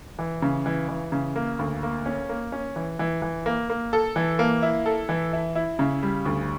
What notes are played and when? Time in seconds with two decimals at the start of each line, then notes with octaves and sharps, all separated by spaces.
0.19 E3
0.42 C#3
0.66 E3
0.88 E3
1.12 C#3
1.36 A#3
1.59 D2
1.83 A#3
2.06 C#4
2.29 A#3
2.52 C#4
2.76 E3
2.99 E3
3.22 E3
3.46 A#3
3.70 A#3
3.93 A4
4.16 E3
4.39 A#3
4.62 E4
4.86 A4
5.09 E3
5.33 E4
5.55 E4
5.79 C#3
6.03 G3
6.25 D2